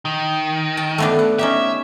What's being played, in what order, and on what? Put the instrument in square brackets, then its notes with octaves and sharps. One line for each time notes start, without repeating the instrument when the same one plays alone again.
[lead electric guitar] D#3
[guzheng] A5
A3 B3 D4
F#5
[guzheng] C#4 D#4 G4 [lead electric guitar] E5